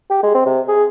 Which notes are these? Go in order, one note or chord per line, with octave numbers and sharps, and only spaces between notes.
G4
G#3
C4
C3
G#4